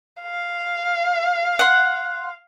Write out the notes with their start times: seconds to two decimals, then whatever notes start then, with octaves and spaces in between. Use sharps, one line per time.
0.22 F5
1.59 F#5 C6